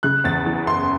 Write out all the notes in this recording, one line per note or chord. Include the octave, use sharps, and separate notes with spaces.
C#3 F#6
E2 A6
E3
F#1 C6